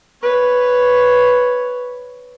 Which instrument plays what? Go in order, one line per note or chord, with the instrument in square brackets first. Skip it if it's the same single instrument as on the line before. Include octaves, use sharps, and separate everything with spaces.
[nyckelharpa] B4 C#5